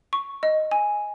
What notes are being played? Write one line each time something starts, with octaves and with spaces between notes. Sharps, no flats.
C#6
D#5
G#5